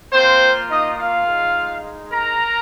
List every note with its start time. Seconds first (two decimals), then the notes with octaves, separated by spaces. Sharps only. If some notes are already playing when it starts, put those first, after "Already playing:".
0.12 A#3 C4 F4 C5
0.69 D#4 D#5
0.98 F4 F5
1.26 G#3 D#4
2.12 A#4 A#5